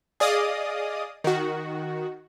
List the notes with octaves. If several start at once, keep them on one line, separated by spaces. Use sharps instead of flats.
G#4 D5 D#5 F5 D#6
D#3 F#4